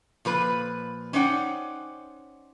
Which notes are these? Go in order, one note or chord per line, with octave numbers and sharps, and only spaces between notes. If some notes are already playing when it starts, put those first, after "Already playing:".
A#2 F3 B4
C#4 D#4 C5 D5 F#5 G5